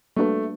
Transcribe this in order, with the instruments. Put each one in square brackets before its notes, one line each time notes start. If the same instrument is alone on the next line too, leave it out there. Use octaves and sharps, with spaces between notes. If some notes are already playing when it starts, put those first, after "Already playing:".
[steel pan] G3 A#3 D4 F#4 B4 [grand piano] A3